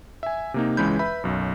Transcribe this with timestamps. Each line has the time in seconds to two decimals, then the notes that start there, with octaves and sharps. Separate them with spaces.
0.23 E5 G#5
0.54 C3 A#3 D#4
0.77 C#2 E3 G#3 C#4 B5 G6
0.99 B4 E5 B5
1.24 B1 F#2